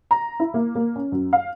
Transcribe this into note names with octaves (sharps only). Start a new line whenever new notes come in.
A#5
E4
A#3
A#3
C#4
F#2
F5